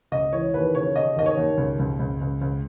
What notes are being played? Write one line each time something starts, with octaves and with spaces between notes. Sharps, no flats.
C#2 D#5
E3 C#5
D#2 B4
C#3 C#5
C#3 D#5
D#2 D#5
C#5
D#2
C#2
C#2
C#2
C#2
C#2